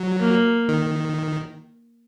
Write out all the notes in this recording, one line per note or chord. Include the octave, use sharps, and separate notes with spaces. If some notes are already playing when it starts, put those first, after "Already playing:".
Already playing: F#3
A#3
D#3